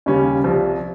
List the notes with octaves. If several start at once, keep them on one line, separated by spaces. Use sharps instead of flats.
D#2 C#3 G3 C#4
C2 C3 F3